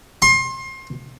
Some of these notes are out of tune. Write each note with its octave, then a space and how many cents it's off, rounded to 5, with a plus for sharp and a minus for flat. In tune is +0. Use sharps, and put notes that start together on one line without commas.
C6 +30